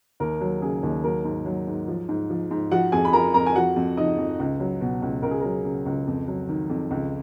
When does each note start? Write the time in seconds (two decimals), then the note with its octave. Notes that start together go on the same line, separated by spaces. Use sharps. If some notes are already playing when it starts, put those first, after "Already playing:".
0.20 D#2 A#4
0.41 F#3
0.62 C#3 G#4
0.83 D#2
1.04 F#3 A#4
1.25 G#2
1.46 F#3
1.67 G#2
1.88 F3
2.09 G#2
2.30 F3
2.51 G#2
2.71 F3 F#4 F#5
2.92 F2 G#4 G#5
3.05 B5
3.13 F3 A#4 A#5
3.34 F2 A#4 A#5
3.46 G#5
3.55 F3 F#4 F#5
3.76 F2
3.97 F3 D#4 D#5
4.18 F2
4.40 C#2
4.60 F#3
4.81 B2
5.02 C#2
5.23 C#2 A#4
5.31 G#4
5.40 F#3 A#4
5.65 C#3
5.86 C#2
6.07 F2
6.28 F#3
6.49 D#3
6.69 F2
6.91 C#2